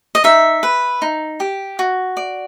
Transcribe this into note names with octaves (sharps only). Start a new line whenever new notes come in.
D#5
D#4 E5
B4
D#4
G4
F#4
D5